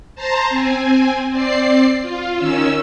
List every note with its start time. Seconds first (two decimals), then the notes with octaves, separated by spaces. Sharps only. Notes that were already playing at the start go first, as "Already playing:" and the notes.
0.15 C5 A5 A#5 C6
0.50 C4 G#5
1.30 C4 D5 C7
2.02 F4
2.36 D#3 C#4 E6